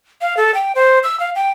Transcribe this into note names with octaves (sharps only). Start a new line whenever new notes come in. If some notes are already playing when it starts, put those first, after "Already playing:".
F5
A4
G5
C5
E6
F5
G5